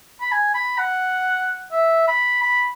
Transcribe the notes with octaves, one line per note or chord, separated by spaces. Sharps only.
B5
G#5
B5
F#5
E5
B5
B5